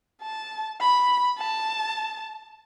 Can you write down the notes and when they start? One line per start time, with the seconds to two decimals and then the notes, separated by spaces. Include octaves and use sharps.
0.22 A5
0.81 B5
1.38 A5